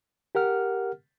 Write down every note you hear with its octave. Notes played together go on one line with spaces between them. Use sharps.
G4 A#4 F#5 F6